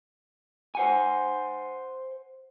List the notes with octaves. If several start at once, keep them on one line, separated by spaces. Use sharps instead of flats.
C5 F#5 G#5